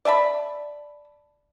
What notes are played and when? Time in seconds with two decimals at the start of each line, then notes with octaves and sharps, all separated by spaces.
0.05 D5 E5 A5 B5